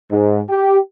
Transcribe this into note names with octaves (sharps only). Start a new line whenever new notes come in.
G#2
G4